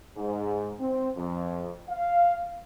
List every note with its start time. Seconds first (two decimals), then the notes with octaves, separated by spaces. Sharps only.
0.16 G#2
0.80 C4
1.17 F2
1.89 F5